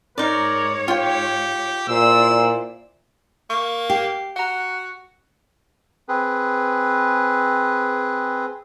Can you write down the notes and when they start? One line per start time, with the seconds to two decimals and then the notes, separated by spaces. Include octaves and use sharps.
0.18 G#2 D#4 A#4 C#5 D5
0.88 F4 G4 G5
1.89 A#2 E4 C5 D5 E6
3.50 A#3 C#6
3.90 G4 C7
4.36 F#4 F#5 A#5
6.09 C4 G#4 B4